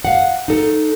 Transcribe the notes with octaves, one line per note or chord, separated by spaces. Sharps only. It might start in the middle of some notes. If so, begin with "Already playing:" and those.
F5 F#5
D#4 A4